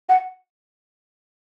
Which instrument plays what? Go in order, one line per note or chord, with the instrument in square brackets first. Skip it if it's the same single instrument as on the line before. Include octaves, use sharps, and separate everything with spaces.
[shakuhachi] F#5